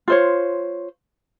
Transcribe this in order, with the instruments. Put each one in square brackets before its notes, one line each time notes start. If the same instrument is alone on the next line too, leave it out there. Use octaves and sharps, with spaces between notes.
[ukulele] F4 C5 C#5